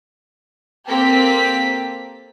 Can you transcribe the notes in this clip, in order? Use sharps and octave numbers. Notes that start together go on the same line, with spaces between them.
A#3 C4 G4 A4 B6